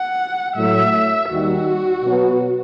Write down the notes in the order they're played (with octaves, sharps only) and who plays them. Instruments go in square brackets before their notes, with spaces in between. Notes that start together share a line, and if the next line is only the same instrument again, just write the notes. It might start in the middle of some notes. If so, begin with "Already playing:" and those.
Already playing: [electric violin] F#5
[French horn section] A2 F#3 A3 [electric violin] E5
[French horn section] D#2 D#3 G3 D#4 [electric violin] F#4
[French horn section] B2 F#3 B3